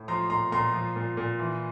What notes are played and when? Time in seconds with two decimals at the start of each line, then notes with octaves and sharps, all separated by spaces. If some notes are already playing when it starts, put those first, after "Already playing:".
Already playing: A2
0.08 F3 A#5 C6
0.30 A#2 A#5 C6
0.52 A#2 A#5 C6
0.73 F3
0.96 A#2
1.17 A#2
1.39 E3